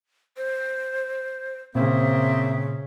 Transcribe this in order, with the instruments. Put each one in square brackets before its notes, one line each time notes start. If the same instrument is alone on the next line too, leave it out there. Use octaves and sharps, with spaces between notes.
[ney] C5
[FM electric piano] A#2 [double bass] C#3 [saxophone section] A#3 C4 [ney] E5